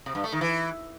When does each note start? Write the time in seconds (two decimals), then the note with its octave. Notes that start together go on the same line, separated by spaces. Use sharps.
0.06 C3
0.15 G2
0.24 A3
0.32 D#3
0.41 E3